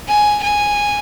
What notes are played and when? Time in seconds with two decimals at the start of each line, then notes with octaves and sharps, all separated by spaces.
0.08 G#5
0.43 G#5